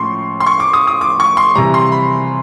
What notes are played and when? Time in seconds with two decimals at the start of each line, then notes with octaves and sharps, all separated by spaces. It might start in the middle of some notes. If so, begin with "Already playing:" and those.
Already playing: A2 F3 G#3 C#4 C6 C#6
0.40 C6
0.46 C#6
0.60 D6
0.73 D#6
0.87 D#6
1.01 D6
1.20 C#6
1.37 C6
1.55 C3 E3 G3 A#5
1.74 C6
1.92 B5